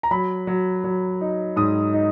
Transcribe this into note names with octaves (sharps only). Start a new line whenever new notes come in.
A#5
F#3 B5
F#3
F#3
D#4
G#2 D#6
D#4